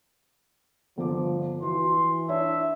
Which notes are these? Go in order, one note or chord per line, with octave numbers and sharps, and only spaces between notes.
G1 F3 B3 D6
E3 F#4 C6
D4 E4 C#5 E5